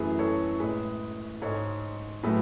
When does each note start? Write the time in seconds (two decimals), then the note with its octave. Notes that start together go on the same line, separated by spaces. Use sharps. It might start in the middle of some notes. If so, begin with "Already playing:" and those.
Already playing: F#2 E3 A3 G#4 B4
0.19 A4 C#5
0.60 A2 G#3 G#4 B4
1.42 G#2 G#3 A4 C#5
2.23 A2 F#3 A3 G#4 B4